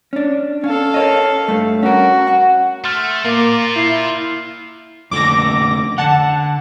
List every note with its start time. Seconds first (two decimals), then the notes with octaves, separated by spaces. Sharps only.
0.13 C#4 D4
0.64 C#4 A4 F5
0.94 A#4 C#5 D#5
1.48 G2 A3
1.83 C#4 F#4 A#4
2.27 F#5
2.84 A3 C6 F6 A6
3.25 A#3 F4 A#4 D6 A#6
3.76 E4 G6 C7
5.11 F2 D3 A3 D6 A#6
5.98 D3 F#5 A5